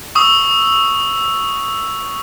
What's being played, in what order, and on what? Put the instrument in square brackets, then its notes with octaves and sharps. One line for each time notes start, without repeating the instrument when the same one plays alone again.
[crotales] C#6 D#6 E6 F#7